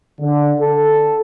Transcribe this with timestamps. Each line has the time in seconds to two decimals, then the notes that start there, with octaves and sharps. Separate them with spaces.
0.20 D3
0.61 A4